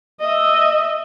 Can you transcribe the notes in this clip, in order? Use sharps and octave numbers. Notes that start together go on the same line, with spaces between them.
D#5 E5